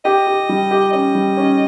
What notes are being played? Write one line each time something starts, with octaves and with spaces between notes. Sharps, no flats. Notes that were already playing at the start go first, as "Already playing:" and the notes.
G4 D#5
G4
G3
G4
C#4 D#5
G3
C#4